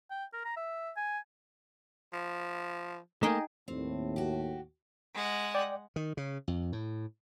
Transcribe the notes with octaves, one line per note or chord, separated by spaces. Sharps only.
G5
A#4
A#5
E5
G#5
F3
A3 A#3 D#4 G#4 D#5 G5
D#2 A2 C4
F#4 G4
G#3 F#5
D5 G5
D#3
C#3
F2
A2